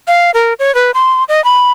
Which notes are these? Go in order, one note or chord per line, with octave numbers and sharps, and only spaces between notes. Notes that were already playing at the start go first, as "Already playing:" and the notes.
F5
A#4
C#5
B4
C6
D#5
B5